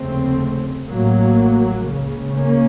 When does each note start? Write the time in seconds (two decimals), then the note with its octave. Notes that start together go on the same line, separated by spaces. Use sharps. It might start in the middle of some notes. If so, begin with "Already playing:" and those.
Already playing: F1 D#2 C#3 A3 C4
0.86 A1 A2 F#3 A#3
1.84 C#2 C#3
2.32 A#3 C#4